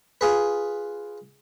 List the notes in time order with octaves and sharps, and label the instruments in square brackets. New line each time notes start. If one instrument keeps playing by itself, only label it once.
[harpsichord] F4 G#4 B4